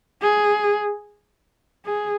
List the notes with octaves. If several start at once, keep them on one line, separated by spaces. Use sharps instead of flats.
G#4
G#4